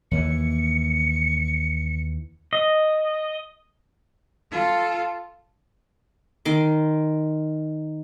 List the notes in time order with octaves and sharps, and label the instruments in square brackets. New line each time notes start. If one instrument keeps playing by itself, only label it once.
[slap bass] D#2 E3 [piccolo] C#7
[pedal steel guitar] D#5
[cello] F4 A4
[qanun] D#3 C6 D6